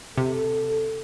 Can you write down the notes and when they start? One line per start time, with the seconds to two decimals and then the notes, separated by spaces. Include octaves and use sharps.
0.18 C3 A4